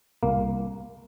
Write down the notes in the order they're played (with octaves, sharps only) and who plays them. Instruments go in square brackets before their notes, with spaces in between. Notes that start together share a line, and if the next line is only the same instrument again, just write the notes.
[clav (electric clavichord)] C2 A#3